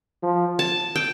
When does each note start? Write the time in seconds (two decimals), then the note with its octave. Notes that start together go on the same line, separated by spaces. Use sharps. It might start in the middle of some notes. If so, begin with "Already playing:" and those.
0.22 F3
0.59 A5
0.96 G5